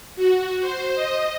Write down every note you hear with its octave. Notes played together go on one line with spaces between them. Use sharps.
F#4
C5
D#5